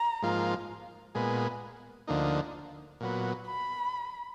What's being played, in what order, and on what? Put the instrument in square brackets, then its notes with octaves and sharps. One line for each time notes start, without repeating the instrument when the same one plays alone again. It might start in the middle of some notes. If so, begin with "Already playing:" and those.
Already playing: [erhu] A#5
[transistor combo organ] G#2 F3 A#3 F4
A#2 G#3 B3
D2 D3 F3 A#3 D#4
A#2 F#3 B3
[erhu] B5